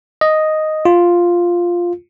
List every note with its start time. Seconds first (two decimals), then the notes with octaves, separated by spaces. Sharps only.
0.21 D#5
0.85 F4